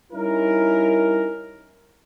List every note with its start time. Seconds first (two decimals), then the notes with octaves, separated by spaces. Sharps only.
0.13 G3 C#4 D#4 E4 A#4